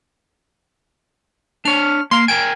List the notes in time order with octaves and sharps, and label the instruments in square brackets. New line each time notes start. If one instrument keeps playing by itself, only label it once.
[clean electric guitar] D4 C#5 [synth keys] F6
[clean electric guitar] A#3 F5 [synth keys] C6
[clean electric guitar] A#4 G5 G#5 [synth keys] D7